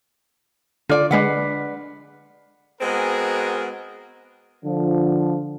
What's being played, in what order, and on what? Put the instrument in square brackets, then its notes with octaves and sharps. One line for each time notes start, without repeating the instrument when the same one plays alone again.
[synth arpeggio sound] D3 [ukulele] F4 D5
[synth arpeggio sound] D3 G#3 [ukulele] D4 B4 F#5
[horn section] G#3 B3 C4 F#4 G#4 A#4
[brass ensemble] D3 F3